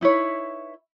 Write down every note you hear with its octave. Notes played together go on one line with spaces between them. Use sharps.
D#4 E4 B4 C#5